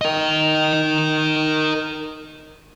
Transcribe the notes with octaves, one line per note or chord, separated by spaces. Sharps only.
A#4 D#5